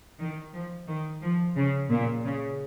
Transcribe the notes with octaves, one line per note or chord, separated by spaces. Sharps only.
D#3
F3
D#3
F3
C#3
A#2
C#3